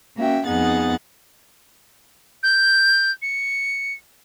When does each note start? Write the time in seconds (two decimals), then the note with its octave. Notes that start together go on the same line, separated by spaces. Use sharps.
0.18 A#3 C#4 F#4 E5 G5
0.47 F2 B3 D#4 G#4 F#5 A6
2.43 G6
3.22 C#7